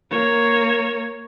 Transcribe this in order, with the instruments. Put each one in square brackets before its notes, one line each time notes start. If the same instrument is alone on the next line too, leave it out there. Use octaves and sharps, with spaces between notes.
[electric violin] A#3 C#5